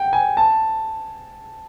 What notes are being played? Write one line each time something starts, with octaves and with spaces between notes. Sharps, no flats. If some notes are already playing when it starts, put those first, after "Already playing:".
Already playing: F#5 G5
G#5
A5